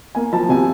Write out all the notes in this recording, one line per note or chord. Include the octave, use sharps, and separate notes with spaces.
A#3 G#5
F3 A5
C3 G#5